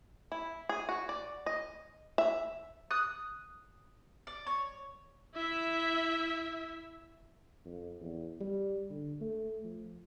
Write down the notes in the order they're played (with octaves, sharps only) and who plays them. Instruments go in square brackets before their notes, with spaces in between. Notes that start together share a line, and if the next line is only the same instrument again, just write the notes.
[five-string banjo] E4
G#4
F#4
D5
D#5
E5
[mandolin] D#6 F#6
D5
C#5
[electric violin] E4 E5
[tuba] F2
E2
G3
D3
A3
F3